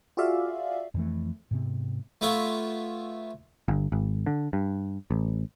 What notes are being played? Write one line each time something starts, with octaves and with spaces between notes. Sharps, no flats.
F4 F#4 G#4 D5 E5 F5
F2 E3 A3
G#2 C3 B3
A3 B3 F4 C#5 E5
G1
G#1
D3
G2
A1